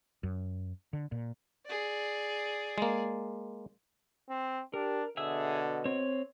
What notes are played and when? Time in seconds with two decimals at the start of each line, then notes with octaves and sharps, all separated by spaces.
0.23 F#2
0.93 D3
1.12 A#2
1.66 G#4 D5
2.78 G#3 A#3
4.29 C4
4.74 D4 G4 A#4
5.17 B2 D3 G#4 E5 E6
5.85 C4 C#5